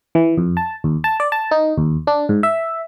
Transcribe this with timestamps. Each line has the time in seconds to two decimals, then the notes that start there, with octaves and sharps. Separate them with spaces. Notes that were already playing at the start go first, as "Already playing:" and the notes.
0.15 E3
0.38 F2
0.57 A5
0.84 D#2
1.04 A5
1.20 D5
1.32 A5
1.51 D#4
1.78 D#2
2.07 D4
2.29 G#2
2.43 E5